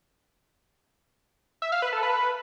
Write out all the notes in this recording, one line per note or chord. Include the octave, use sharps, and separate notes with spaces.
E5
F5
B4
A4
B4